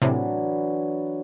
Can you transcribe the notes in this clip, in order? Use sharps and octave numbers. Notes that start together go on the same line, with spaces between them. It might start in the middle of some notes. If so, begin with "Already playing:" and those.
A2 C3 E3 F#3 D4